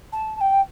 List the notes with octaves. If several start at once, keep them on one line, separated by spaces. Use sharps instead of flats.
A5
A5
G5